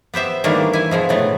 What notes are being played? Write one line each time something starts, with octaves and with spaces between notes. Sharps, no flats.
B3 G4 C5 E5
D#3 E3 G3 A3 A#3 D4
E4 G#5
B2 F3 G#3
A2 C3 E3 A3 B3